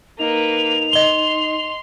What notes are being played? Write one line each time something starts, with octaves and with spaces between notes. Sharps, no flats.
A#3 D#4 B4 F7
D#5 C6 G7